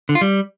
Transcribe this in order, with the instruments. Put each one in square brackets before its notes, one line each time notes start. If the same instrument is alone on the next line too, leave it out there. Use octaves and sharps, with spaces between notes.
[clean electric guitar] D3
F4
G3